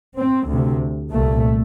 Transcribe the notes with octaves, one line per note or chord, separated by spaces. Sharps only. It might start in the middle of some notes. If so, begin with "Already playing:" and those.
C4
D2
C3
C2 A#2 A3